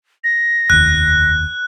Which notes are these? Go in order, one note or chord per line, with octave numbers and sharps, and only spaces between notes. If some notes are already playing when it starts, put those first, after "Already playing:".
A#6
F1 D#2 F#6